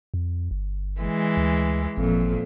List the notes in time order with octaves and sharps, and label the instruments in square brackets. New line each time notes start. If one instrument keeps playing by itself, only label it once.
[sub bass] F2
G1
[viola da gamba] E3 G#3
[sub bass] D2
[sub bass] G#1 [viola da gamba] F2 A#2